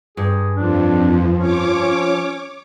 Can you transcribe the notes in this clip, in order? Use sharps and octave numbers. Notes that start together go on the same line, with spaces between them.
G2 G#4
F2 F3 D4
C#4 C#5 D6